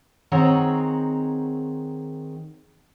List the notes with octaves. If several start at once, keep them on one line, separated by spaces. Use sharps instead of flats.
D#3 C4 G#4 C#5 F#5 A#5